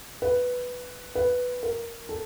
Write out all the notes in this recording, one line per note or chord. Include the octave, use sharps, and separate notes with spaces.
B4
B4
A#4
A4